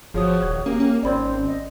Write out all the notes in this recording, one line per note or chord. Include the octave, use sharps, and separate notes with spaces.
G1 F3 F#4 G#4 C#5 D#6
D#1 G#6
A#3 C#4 G4
C#4
G#1 C4 D5 B5 G#6
D#5